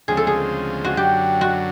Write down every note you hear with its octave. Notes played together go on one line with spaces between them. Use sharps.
D2 C#3 F3 G#3 C4 G#4
A4
G#4
F#4
F#2 D3 F#3 G4
F#4